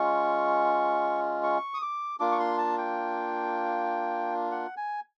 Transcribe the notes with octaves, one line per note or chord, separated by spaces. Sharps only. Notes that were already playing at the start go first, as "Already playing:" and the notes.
Already playing: G#3 C#4 F4 C#6
C#6
D#6
D6
A#3 D4 F4 D6
C#6
C6
A5
G5
F#5
G#5